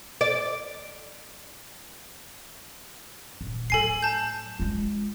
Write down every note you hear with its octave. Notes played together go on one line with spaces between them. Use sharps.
D5
D#1
A2 F#3 A4 G#5 C7
A5 G6
G#3 F4